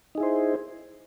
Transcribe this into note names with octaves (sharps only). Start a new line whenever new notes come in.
D#4 E4 G#4 C5